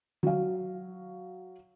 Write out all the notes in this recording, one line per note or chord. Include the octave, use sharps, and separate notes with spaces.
F#3 F5